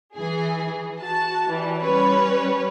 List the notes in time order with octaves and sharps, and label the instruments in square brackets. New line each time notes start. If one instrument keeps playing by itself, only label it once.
[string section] E3 G#4
F#4 A5
E3 G3
G3 C#4 B4 C#5